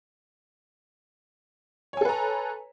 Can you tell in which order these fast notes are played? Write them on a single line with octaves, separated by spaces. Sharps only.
C#5 G#5 A4 B4 A#5